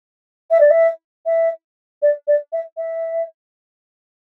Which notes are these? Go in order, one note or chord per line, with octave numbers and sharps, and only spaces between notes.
E5
D5
E5
E5
D5
D5
E5
E5